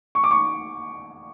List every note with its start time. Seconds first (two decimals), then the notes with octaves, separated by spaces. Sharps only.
0.15 C#6
0.24 D6
0.31 C#6